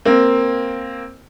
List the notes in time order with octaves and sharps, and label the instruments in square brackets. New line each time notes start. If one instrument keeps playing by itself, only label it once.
[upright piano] A#3 C4